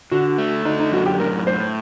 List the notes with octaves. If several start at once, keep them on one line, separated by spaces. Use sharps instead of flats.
D3 F#4
A3
D3 D#4
D#4
F#2 F#4
G4
A2 A#4
A2 C5